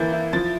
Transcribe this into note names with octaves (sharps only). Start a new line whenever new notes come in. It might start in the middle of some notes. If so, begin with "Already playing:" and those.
Already playing: E3 A#3 E4 G6 A6
E4
F3 A6